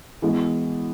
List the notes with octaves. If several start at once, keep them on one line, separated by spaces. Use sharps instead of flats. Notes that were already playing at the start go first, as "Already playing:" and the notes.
E3 G#3 B3 F#4